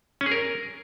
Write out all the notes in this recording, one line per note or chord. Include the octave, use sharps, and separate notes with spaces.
C#4
G#4
A#4